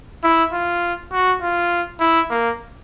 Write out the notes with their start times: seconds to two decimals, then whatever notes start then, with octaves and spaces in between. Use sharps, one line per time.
0.24 E4
0.53 F4
1.12 F#4
1.42 F4
2.00 E4
2.30 A#3